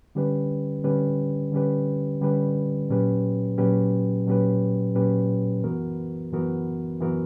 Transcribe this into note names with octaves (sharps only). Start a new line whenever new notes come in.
D3 G3 C#4 G4 B4
D3 G3 C#4 G4 B4
D3 G3 C#4 G4 B4
D3 G3 C#4 G4 B4
A#2 F#3 C#4 G4 B4
A#2 F#3 C#4 G4 B4
A#2 F#3 C#4 G4 B4
A#2 F#3 C#4 G4 B4
F#2 E3 B3 F#4 A#4
F#2 E3 B3 F#4 A#4
F#2 E3 B3 F#4 A#4